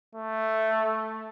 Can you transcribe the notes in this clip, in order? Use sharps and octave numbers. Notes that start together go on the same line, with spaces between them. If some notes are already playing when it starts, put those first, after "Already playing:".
A3